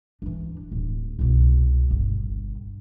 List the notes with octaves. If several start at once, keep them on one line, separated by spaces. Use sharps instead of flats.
E3 D4
D1
C2 B2
G1